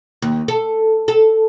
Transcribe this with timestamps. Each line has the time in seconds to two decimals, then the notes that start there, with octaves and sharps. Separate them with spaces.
0.22 D#2
0.48 A4
1.08 A4